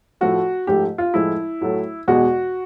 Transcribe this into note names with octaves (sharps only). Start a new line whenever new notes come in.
A2 F3 A3 F#4
G#2 F3 A3 G4
F4
A2 F3 G#3 E4
A2 F#3 A3
E2 B2 G#3 F#4